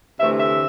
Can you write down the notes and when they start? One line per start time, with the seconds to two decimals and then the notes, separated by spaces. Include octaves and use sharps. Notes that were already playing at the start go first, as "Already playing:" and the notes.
0.20 D2 C3 E3 A3 E5
0.38 E5